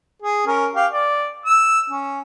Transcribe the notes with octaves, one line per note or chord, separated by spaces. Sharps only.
G#4
C#4 A#4
G4 F5
D5
E6
C#4